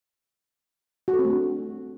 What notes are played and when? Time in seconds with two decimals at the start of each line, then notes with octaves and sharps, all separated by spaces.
1.08 F#4
1.13 A4
1.19 C4
1.25 A3
1.30 D4